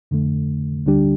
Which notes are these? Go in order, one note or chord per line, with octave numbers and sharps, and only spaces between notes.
F2 D3 A3
D2 D3 G3 D4 G4